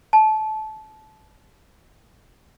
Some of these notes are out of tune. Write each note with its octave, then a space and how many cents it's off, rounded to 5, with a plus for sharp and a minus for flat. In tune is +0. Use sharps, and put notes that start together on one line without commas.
A5 -25